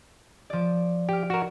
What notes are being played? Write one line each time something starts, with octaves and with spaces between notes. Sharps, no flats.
F3 D5
G4 F6 D7
F#4 A#4 E7